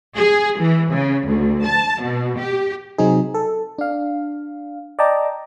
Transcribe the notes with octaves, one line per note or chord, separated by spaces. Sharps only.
G#4
E3
C#3
D2
A5
B2
G4
C3 F#3 C4 D#4 G#4
A4
D4 F5
D5 D#5 G5 A5 A#5 D6